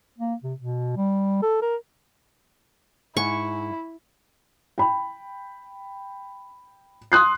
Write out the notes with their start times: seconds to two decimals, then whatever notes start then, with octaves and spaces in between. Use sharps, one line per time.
0.18 A#3
0.43 C3
0.60 B2
0.97 G3
1.42 A4
1.62 A#4
3.17 G#2 E4 G#5 C#6
4.78 G5 B5
7.12 C6 D#6 F#6 C7